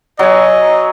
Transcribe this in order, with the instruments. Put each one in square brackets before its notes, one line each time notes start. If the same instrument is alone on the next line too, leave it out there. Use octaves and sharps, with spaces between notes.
[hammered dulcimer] F#3 G#5 [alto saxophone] D#5